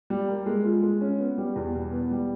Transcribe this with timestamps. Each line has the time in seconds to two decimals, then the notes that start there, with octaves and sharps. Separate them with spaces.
0.10 G3
0.28 A#3
0.46 G#3
0.65 F4
0.83 G#3
1.01 C#4
1.20 B3
1.38 G3
1.56 E2
1.74 B2
1.92 B3
2.11 G3